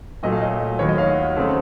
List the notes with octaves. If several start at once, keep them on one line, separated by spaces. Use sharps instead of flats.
A#2 F#3 A3 D#5
F5
D#5
D#2 D#3 F#3 C#5
D#5
F5
F#5
C#3 A3 C4